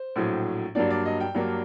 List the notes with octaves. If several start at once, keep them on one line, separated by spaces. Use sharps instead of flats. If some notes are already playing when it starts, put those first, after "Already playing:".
Already playing: C5
A#1 A2 F#3
G2 F#3 A#3 D4 D5
D5
D#5
G5
G2 F#3 A#3 D4